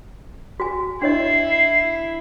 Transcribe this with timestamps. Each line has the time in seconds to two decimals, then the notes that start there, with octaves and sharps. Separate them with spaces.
0.60 F#4 G#5
1.02 D4 E4 C#5 D#5 C7